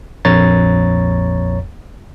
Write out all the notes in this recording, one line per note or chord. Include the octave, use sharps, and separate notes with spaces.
A#1 F2 C#5 A#5 A6